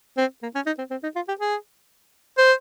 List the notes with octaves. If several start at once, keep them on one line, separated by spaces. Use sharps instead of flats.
C4
A#3
C#4
D#4
C4
C4
D#4
F4
G4
G#4
C5